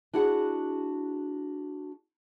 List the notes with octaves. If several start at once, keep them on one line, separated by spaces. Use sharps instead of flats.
D4 E4 F#4 G#4 F#5